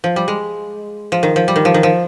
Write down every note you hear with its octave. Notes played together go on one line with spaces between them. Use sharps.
F3
G3
G#3
F3
D#3
F3
G3
D#3
F3
D#3
F3